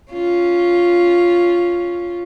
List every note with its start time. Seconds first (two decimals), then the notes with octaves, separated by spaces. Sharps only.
0.12 C#4 F4